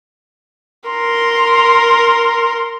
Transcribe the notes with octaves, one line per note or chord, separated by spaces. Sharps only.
A#4 C6